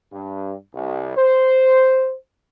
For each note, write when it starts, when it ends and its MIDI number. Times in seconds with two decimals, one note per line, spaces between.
0.12 0.55 43
0.74 1.14 36
1.17 2.16 72